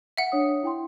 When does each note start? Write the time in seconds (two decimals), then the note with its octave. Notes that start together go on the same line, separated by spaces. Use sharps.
0.17 E5 F#5
0.32 D4 C#5 D#6
0.63 E4 G5 C6